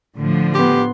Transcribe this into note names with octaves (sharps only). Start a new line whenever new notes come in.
A2 D3 F3
B3 G4 C6